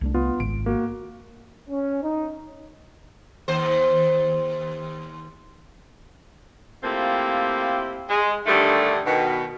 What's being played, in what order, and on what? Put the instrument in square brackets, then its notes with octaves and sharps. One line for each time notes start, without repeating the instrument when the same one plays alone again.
[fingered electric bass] C2 A3 D4
[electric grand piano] B3 F4
[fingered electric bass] G#1 [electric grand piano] D7
[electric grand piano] A#3 F#4
[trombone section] C#4
D#4
[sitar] D#2 C5
[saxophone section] A3 A#3 C4 E4 F4 G4
G#3
G2 D3 D#3 G3 A3
B2 D#3